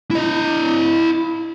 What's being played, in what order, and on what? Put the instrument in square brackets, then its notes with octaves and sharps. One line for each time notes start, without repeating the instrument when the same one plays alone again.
[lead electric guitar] E4 D#5